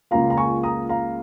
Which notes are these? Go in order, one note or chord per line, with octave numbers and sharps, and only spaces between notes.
C#2 C#3 A#3 F4 F5 A#5
A#5
G#5 C#6
A#5 D#6
F5 A#5